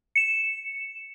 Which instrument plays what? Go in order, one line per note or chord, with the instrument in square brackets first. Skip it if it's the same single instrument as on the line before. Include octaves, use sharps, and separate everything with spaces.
[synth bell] C#7 E7